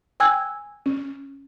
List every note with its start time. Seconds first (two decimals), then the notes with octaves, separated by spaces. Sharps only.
0.20 G5 G#5 E6 F#6 G#6
0.86 C#4